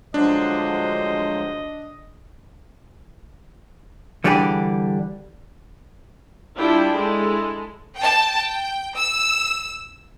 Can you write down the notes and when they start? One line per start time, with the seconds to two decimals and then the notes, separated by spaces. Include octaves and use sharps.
0.14 D2 F3 F#3 G#3 D4 C5 D#5
4.24 D3 E3 G3 D4 G4 G#4
6.56 G3 D4 E4 F4 G5
6.94 G#3 E4 A4
7.97 G5 A5
8.38 G5
8.97 E6